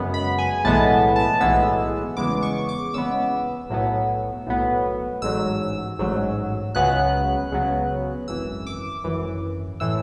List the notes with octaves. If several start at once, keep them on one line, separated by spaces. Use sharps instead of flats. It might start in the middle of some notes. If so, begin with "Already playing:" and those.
Already playing: F#2 C#3 G#3 B3
B5
G#5
B1 A2 E3 G#3 B3 A5
A5
B1 A2 E3 G#3 B3 E6
E2 C#3 G#3 B3 D6
C#6
D6
E2 C#3 G#3 B3 E6
B1 A2 F#3 B3
B1 A2 F#3 B3
A1 G#2 F#3 E6
A1 G#2 F#3
C#2 C#3 F#3 B3 F#6
C#2 C#3 F#3 B3
G#1 F#2 E3 E6
D6
G#1 F#2 E3
A2 E3 E6